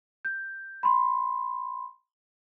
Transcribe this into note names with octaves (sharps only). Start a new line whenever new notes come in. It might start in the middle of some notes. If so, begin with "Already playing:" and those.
G6
B5 C6